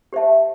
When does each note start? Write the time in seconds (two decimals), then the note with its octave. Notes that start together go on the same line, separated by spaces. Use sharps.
0.13 G4 C5 E5 A5